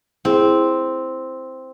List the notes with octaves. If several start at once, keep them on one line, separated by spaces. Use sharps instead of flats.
C4 E4 G#4